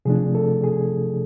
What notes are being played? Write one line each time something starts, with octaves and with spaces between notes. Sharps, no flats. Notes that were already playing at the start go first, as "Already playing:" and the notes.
C3 F3 A3 D4 G#4
A4
G#4